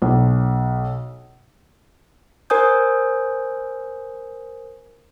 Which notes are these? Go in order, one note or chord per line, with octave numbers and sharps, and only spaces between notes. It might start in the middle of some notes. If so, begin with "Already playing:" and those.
B1
A#4 C5 G#5 D#6 G6